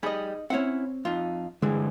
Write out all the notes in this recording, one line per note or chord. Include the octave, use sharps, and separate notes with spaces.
G3 D#4 G#4 D#5 B5
C4 C#4 E4 C#5 F#5
F2 D#4 F4
G2 D3 E3 G#3 G#4